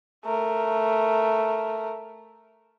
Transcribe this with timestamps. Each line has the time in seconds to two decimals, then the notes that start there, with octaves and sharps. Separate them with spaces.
0.24 A3 A#4